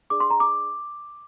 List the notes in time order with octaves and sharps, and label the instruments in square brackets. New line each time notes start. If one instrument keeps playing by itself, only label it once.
[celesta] D4 G#4 D5 D6
C6
A#5
D6